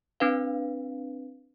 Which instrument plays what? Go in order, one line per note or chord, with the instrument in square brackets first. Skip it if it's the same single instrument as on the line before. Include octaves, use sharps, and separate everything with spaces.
[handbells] C4 D4 B4 F5